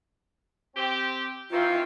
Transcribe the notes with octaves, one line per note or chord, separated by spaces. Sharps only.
C4 G4
D#3 E3 C4 F4